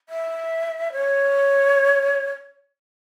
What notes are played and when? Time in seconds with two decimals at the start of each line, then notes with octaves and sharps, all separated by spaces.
0.09 E5
0.92 C#5